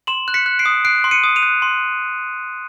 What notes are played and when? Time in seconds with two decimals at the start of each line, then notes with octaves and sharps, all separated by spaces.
0.07 C6 E7 F#7
0.28 F#6
0.34 B6 C#7
0.46 F#6
0.59 C7 D7
0.66 D#6
0.85 F#6 C7 D7
1.04 C6
1.11 C#7 D#7
1.24 D#6
1.36 D#7 F7
1.43 F#6
1.62 C6